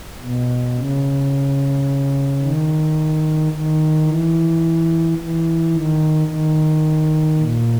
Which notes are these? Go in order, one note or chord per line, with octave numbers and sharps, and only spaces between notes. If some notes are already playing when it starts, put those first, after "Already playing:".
B2
C#3
D#3
D#3
E3
E3
D#3
D#3
A#2